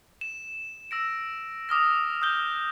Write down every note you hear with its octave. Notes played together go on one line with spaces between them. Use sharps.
E7
E6 A#6 D7
D6 D#6 F6 A#6
D#6 F#6 G6 G7